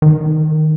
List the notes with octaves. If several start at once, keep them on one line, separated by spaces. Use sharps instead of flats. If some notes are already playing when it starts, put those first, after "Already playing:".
D#3